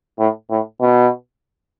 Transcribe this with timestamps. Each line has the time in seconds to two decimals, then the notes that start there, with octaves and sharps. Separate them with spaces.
0.19 A2
0.50 A2
0.81 B2